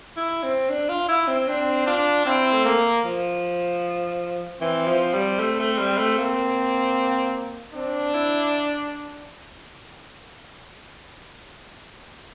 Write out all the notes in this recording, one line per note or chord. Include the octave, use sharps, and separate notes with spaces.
E4
C4
D4
F4
E4
C4
C4 D4
D4 F4
C4 E4
A3
A#3
F3
E3 C4
F3
G3
A3
A3
G3
A3
A#3
C4 D4
E4